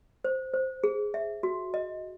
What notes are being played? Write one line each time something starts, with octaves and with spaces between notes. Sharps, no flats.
C5
C5
G#4
E5
F#4
D#5